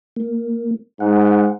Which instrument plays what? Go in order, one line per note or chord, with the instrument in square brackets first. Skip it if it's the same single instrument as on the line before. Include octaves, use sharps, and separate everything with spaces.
[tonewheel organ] A#3
[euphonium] G#2 [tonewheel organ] F#5